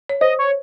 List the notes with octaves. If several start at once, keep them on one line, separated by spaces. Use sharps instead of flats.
C#5
C5 D#5
C#5